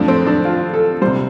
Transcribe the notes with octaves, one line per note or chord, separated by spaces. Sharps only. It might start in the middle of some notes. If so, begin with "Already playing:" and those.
Already playing: F2 F3 A3 D4
C4
D4
F4
A4
C3 G3 C5